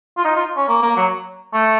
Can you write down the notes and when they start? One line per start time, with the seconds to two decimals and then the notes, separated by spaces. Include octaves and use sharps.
0.17 F4
0.25 D#4
0.36 F4
0.57 C#4
0.68 A#3
0.82 A#3
0.96 F#3
1.53 A3